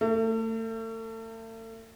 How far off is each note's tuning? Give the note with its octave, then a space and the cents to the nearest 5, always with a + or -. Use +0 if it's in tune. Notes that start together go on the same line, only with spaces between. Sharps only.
A3 +35